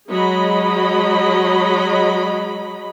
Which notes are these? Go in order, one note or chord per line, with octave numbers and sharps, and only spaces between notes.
F#3 G#3 D#5 B5